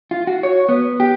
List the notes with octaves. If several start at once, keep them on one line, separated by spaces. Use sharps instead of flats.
F4
F#4
C#5
B3
G4